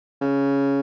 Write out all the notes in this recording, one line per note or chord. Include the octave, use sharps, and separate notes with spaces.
C#3